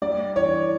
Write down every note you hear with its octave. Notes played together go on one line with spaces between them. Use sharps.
G3 D5
E3 C#5